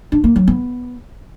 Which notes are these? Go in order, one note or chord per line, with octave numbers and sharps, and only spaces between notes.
D4
A#3
F#3
B3